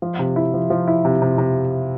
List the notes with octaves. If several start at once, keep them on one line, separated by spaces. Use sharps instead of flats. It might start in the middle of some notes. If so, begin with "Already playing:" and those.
F3
C3
E4
F3
F3
E4
C3
C3
C3